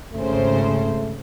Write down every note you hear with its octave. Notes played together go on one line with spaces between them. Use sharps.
G#1 C#3 A3 C5